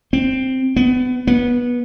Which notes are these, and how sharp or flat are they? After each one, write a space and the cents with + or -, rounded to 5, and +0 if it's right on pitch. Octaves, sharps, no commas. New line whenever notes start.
C4 +0
B3 +30
B3 -20